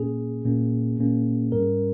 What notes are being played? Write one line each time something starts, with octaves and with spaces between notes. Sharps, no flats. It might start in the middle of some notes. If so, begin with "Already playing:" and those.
Already playing: A#2 A#3 C#4 G#4
A#2 A#3 C#4
A#2 A#3 C#4
G#2 G3 C#4 A#4